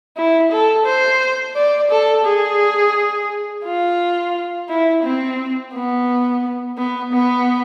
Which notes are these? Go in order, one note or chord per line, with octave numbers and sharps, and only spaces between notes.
E4
A4
C5
D5
A4
G#4
F4
E4
C4
B3
B3
B3